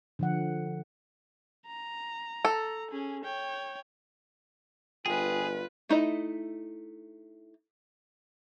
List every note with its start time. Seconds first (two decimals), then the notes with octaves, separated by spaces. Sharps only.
0.19 D3 F3 F#5
1.67 A#5
2.45 A4
2.91 C#4 G#4
3.24 C#5 G5
5.06 G1 F4 G#4 B4 G5 G#5
5.89 A3 D#4 E4 D#5